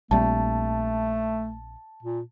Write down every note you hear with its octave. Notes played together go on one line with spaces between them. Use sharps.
A#1 G3 A3 C4 A5
A#2